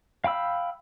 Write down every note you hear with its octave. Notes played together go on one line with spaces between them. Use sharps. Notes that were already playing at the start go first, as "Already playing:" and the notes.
F5 G5 B5 E6